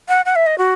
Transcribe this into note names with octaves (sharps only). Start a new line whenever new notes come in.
F#5
F#5
E5
D#5
F#4